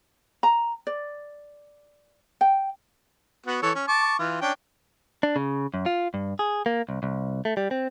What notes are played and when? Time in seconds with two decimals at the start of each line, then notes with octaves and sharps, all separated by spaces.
0.43 A#5
0.87 D5
2.41 G5
3.46 B3 F#4
3.62 E3 A4 C#5
3.75 C#4
3.88 A5 C#6 D6
4.19 E3 F4
4.41 C#4 D4 G5
5.23 D4
5.36 C#3
5.74 F#2
5.86 F4
6.14 G2
6.39 G#4
6.66 A#3
6.89 C2
7.03 C2
7.45 A3
7.57 G3
7.71 C4